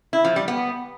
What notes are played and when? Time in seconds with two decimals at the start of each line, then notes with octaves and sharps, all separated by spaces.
0.13 E4
0.25 F3
0.36 G3
0.48 B3